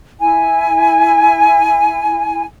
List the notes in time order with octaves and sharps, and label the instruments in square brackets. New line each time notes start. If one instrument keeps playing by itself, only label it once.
[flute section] E4 G#5